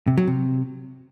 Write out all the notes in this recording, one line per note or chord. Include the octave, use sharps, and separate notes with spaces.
C3
F#3
C3